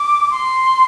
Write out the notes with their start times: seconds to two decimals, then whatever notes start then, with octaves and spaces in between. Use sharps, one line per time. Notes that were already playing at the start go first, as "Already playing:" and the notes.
Already playing: D6
0.31 C6